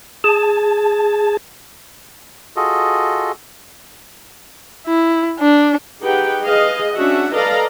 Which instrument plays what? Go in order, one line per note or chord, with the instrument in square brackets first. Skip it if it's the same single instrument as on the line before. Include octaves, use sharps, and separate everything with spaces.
[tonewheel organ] G#4 A5
[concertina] F4 F#4 G#4 A4 D#5
[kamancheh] E4
D4
[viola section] D#4 G4 G#4 B4 F#5 G5
G#4 B4 D#5 F5
C#4 D4 F#4 E5 F#5
A4 B4 D5 D#5 F5 A#5